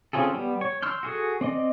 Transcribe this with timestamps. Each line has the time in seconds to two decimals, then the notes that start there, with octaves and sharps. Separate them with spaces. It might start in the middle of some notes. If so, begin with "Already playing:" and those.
0.13 C4 C#4 F4 G#4 A4
0.34 G3 B3
0.61 C#5
0.82 C6 E6 F6 G6
1.03 F#4 G#4 A4
1.41 C4 D5 D#5